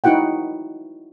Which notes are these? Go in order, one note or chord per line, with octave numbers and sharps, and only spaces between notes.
D#4 E4 F#4 F#5 G5